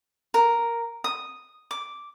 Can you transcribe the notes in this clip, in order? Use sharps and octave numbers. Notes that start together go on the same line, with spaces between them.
A#4
D#6
D6